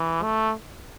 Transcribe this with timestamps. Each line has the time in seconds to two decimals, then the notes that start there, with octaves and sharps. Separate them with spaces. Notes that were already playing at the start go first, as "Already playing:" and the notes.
Already playing: E3
0.23 A3